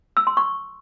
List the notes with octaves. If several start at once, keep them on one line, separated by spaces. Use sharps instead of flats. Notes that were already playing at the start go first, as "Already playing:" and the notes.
E6
C6
C#6